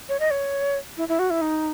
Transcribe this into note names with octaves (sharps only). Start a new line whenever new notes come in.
C#5
D#5
C#5
E4
E4
F#4
E4
D#4